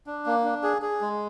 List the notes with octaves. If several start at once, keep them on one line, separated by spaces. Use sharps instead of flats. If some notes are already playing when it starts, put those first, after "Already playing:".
D4
A#3
D4
G#4
G#4
G#3